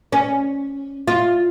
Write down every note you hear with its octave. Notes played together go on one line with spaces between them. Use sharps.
C#4
F4